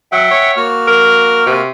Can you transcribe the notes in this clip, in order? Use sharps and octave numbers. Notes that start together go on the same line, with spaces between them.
F#3 E5 F#5 G5
C#5
A#3 F#4 F6
A#4
C3